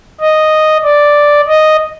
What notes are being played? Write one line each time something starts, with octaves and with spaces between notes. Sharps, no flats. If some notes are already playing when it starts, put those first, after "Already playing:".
D#5
D5
D#5